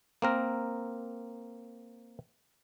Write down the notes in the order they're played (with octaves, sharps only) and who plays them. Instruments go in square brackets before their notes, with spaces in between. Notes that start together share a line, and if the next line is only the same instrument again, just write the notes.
[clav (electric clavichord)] A#3 C4 A#4